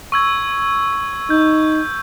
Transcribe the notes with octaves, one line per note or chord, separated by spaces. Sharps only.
C#6 E6 G#6
D#4 G6